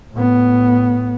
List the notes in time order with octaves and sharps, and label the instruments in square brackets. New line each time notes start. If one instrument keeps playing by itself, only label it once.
[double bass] A2 B3